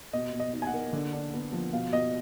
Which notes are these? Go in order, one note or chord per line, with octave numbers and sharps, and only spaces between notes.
B2 D#5
B2
D#5
D#4
G#5
F#5
A#3
D3
D4
B3
F3
B2 F5
B2 D#5